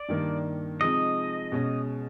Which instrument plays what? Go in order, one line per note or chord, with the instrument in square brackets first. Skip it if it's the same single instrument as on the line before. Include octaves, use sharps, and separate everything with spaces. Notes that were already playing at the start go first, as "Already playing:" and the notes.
Already playing: [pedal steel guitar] D5
[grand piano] G2 D#3 G3 A#3 D4
[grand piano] C3 F3 G#3 C4 D#4 [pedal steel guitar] D#5
[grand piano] B2 G#3 C#4